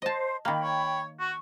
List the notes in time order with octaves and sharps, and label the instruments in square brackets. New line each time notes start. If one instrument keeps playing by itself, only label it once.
[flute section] C5 [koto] D#5 A5
[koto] D#3 A#3 [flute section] G5 B5
[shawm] C#5
[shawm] F#4 [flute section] C#6